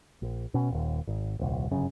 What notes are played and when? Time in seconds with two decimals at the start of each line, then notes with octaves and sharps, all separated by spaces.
0.22 A#1
0.54 B2 C#4
0.71 D#1 D#2
1.07 G#1
1.39 D#1 C2
1.71 G1 F#2 C#3